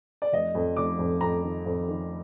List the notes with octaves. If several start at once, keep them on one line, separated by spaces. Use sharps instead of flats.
D5
F1 D#5
F2
F1 D6
F2
F2 A#5
D#3
F2
D#3